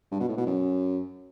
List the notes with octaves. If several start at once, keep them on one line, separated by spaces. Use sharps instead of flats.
G2
B2
A2
B2
F#2